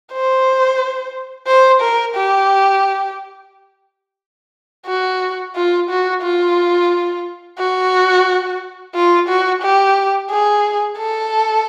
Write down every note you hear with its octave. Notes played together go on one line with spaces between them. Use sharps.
C5
C5
A#4
G4
F#4
F4
F#4
F4
F#4
F4
F#4
G4
G#4
A4